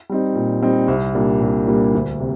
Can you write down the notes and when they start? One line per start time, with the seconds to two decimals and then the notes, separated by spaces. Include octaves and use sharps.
0.10 G3 C4 D#4
0.36 A#2
0.62 G3 C4 D#4
0.88 C2
1.15 A#2 G3 A#3 D4
1.42 C2
1.67 A#2 G3 A#3 D4
1.95 D2
2.20 C3